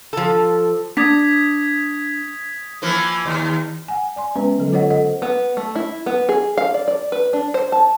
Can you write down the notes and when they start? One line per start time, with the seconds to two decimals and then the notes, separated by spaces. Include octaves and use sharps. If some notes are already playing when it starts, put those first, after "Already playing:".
0.13 F3 A4
0.97 D4 D#6 G#6 B6
2.82 E3 F3 A#3
3.26 D#2
3.88 F#5 G#5
4.16 D5 G#5 C6
4.36 G#3 B3 C#4 B4
4.59 D3 F#3 A4
4.72 F4 A4 C5 C#5 D#5 F#5
4.90 A4 C5 D#5 F#5
5.22 B3
5.57 A3
5.75 E4
6.06 B3
6.29 G#4
6.58 F5
6.74 D5
6.88 D5
7.12 B4
7.33 D4
7.54 C5
7.72 A5